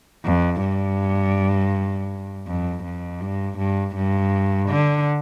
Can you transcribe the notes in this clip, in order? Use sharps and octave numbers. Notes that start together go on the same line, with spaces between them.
F2
G2
F2
F2
G2
G2
G2
D3